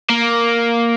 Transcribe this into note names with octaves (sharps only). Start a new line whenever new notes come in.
A#3